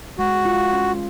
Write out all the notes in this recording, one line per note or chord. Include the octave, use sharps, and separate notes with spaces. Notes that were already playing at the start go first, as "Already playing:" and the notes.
G#3 F#4
F4
C#4